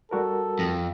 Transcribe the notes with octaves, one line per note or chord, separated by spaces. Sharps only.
G3 F#4 A4 A#4
F2